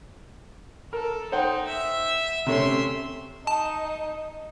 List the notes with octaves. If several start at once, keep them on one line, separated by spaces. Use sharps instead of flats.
A4 A#4
D#4 C5 F#5 G5
E5
C3 A3 C#4 E5 C6
D#4 A5